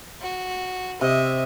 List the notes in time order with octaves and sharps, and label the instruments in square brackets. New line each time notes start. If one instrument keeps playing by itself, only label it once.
[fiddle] F#4
[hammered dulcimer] C3 [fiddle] D#5 E5